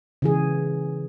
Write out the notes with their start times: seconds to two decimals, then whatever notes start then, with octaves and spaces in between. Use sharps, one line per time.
0.22 C#3 E3 G#4